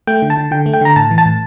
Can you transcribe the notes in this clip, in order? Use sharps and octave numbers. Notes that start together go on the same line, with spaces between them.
A3 G5
D3
A5
D3
D3 G5
A3
G5
D3 A#5
A2 A5
E3
A5
A2